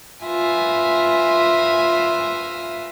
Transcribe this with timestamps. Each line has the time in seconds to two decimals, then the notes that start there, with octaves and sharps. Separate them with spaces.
0.24 F4 B4 E5 G#5 A#6